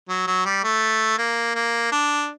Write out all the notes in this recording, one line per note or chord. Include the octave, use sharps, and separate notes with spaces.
F#3
F#3
G3
A3
A#3
A#3
D4